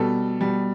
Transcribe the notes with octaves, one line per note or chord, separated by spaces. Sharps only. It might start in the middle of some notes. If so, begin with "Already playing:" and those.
Already playing: B2 G3 A4
B2 G3